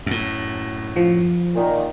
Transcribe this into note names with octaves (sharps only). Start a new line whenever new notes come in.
F#2 A2
F3
A#2 D#3